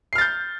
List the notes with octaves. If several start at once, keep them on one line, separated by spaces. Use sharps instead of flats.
F6 G6 A6 C7